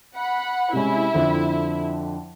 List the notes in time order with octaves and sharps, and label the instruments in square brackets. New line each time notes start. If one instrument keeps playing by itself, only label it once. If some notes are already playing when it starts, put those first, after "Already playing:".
[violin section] F#5 B5
[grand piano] C3 G#3 C#4 [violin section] E4
[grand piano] F2 D3 F3